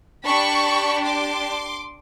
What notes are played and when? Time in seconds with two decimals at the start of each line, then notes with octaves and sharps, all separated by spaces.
0.25 D4 G4 B5 C#6
1.05 C6 D6